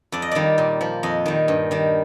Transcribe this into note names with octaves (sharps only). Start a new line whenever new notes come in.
F2 D5
D#5
D#3 G3 D5
A#2
F3
F2 D#5
D#3 G3
G2
D#3 G3